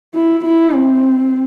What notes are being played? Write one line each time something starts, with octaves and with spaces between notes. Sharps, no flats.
E4
E4
C4